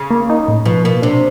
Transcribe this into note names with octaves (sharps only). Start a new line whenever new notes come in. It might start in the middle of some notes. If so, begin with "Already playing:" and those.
Already playing: C#3
A#3
D#4
A2
B2 F3
B2 A#3
C3 D4